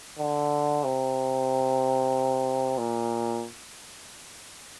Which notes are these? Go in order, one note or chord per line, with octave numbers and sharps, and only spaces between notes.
D3
C3
A#2